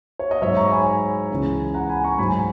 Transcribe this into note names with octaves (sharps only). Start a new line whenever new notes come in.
C#5
D#5
G#2 F#3 C#5 E5
A#5 C#6
G#5 B5
C#2 C#3 E3
F#5 A#5
G#5 B5
A#5 C#6
G#2 F#3 G#5 B5